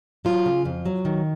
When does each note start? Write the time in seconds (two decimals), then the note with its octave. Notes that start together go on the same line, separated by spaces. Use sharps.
0.25 F#3 F4
0.46 C#3
0.65 F2
0.86 F#3
1.05 D#3